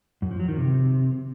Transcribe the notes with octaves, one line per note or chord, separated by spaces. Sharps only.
F#2
F3
F#3
D#3
C3